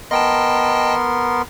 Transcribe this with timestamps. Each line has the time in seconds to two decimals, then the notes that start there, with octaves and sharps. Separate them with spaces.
0.11 B3 A#4 D#5 G5 A5 C6